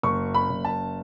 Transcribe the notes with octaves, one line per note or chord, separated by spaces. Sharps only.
F#1 C#6
B5
F#1
A5